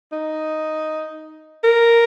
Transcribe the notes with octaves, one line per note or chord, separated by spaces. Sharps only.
D#4
A#4